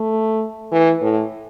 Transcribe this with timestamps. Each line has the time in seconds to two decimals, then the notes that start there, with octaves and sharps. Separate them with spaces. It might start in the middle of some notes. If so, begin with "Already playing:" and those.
Already playing: A3
0.71 E3
1.02 A2